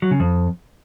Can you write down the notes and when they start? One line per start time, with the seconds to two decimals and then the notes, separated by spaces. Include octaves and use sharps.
0.02 F#3
0.11 C#3
0.20 F2